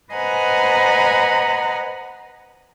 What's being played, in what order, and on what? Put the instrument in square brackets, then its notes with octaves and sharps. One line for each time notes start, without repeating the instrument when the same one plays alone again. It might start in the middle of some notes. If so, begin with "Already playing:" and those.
[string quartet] B4 C5 D#5 F#5 G#5 A#5